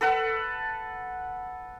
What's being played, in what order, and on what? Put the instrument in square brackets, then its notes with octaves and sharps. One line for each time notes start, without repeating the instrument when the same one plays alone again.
[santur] A4 B4 F#5